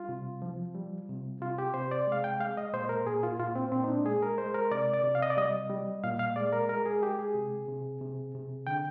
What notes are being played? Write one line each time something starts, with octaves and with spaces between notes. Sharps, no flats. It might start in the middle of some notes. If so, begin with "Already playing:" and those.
Already playing: G3 F4
C3
F3
G3
C3
C3 F4
G4
C3 C5
D5
G#3 F5
G5
G#3 F5
D#5
A#2 C5
A#4
A#2 G#4
F4
A#2 F4
C4
A#2 C4
D#4
D4
G#3 G#4
A#4
G#3 C5
A#4
C3 D5
D5
C3
F5
D#5
D5
G3 D#5
G3
A#2 F5
F5
G#3 D5
A#4
G#3 A#4
G#4
G#3 G4
G#4
C3
C3
C3
C3
D3 G5